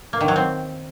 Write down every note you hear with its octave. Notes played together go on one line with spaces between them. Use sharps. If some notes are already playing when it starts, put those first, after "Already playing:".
A#3
D#3
F#3
C4